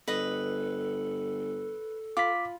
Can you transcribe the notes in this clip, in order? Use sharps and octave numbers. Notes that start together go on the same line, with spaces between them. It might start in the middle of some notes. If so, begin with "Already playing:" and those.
G1 A4 B4 D#5 D#6
F4 B5 D6 B6